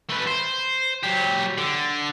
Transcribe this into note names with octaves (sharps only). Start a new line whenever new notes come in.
A3 B4
C5
F#3 G4
D3